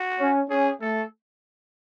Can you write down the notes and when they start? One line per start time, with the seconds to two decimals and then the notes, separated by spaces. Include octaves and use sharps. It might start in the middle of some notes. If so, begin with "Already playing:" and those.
Already playing: F#4
0.19 C#4
0.49 C#4 G#4
0.81 A3 A4